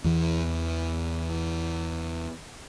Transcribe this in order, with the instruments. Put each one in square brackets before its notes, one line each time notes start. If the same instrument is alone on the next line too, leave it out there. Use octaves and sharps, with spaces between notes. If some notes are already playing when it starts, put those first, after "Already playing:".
[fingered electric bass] E2 E3